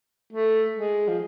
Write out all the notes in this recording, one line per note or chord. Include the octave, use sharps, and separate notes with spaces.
A3
G#3
F3